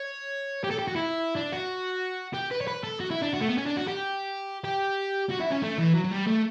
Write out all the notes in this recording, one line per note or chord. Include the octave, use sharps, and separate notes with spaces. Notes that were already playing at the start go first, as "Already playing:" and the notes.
Already playing: C#5
G4
A4
G4
F#4
E4
D4
F#4
G4
B4
C#5
B4
A4
F#4
E4
D4
F#4
A3
B3
C#4
D4
F#4
G4
G4
F#4
E4
C#4
A3
E3
F#3
F#3
G3
A3